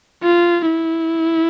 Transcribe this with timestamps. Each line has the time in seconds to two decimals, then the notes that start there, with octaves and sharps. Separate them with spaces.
0.23 F4
0.66 E4